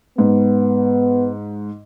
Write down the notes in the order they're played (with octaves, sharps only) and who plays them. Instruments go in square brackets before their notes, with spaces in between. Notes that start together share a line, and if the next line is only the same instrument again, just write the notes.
[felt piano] G#2 [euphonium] B3